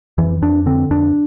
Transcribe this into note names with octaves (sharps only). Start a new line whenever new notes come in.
F2 E3
F2 D4
D3 C4
F2 D4